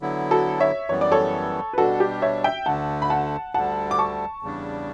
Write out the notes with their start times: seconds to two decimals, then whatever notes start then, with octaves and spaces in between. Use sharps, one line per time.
0.01 D3 F#3 B3 E4
0.31 F#4 A4
0.60 C#5 E5
0.89 F#2 E3 G3 B3 C#5
1.01 D5
1.12 A4 C#5
1.73 B4
1.78 B2 G3 D4 F#4 A4
2.00 G4
2.22 C#5 E5
2.44 E5 G5
2.66 D2 D3 A3 F#5 A5
3.02 B5
3.10 F#5 A5
3.54 D2 D3 G3 F#5 A5
3.91 D6
3.99 A5 C#6
4.42 E2 C#3 G3 D4